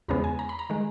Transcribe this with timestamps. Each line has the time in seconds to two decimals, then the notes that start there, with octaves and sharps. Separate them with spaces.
0.08 E2 C#3 G#3 B3 A#5
0.24 G#5
0.39 A#5
0.49 B5
0.59 A#5
0.70 D#3 G#3